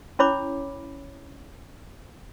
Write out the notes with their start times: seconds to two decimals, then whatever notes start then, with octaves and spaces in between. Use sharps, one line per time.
0.19 C#4 E4 C#5 B5 D6